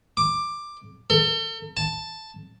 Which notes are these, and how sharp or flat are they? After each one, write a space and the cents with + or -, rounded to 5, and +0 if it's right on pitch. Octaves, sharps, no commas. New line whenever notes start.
D6 +10
A4 +40
A5 +5